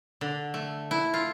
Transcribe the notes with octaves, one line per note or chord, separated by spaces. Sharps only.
D3
A3
E4
F4